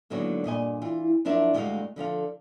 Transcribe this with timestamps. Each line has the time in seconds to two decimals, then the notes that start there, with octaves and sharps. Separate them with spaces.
0.10 G#2 D3 D#3 F#3 A#3 B3
0.44 G2 A#2 D#5 G#5
0.82 E3 F4
1.25 F#2 F3 D4 E4 A#4 E5
1.54 D2 G2 G#3 A3 F#4 F5
1.96 D3 F3 A4 F5